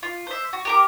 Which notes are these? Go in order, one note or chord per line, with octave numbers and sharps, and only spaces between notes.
F4
C5 E5
F#4
G4 A#4 D6